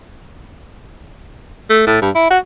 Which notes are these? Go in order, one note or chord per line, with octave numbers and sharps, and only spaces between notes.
A3
A2
G2
E4
F#4